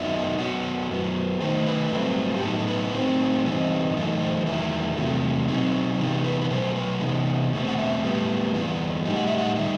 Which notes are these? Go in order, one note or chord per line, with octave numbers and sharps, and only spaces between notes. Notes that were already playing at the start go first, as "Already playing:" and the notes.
Already playing: F#2 F#3 B3 D#4 E5
F#2 F#3 B3 F#5
F#2 F#3 B3
D#3 A3 D#4 C5
B4
G2 F#3 A3 C4
G4
A2 F#3 B3 D#4 A4
B4
A2 F#3 C4 D#4 C5
G2 E3 A3 C4 D#4
F#2 E3 A3 D#4
C5
E2 D#3 F#3 A3 E4
E2 C3 F#3 A3
B2 F#3 C4 D#4
C3 E3 B3 D#4 G4
B4
B4
B2 F#3 A3 C5
B4
C3 E3 B3 D#4
E2 B2 A3 C4
F#5
E5
A2 G3 B3
G2 E3 B3 E4
A2 G3 D#4
F#5
E5
F#5
D#3 G3 D#4 E5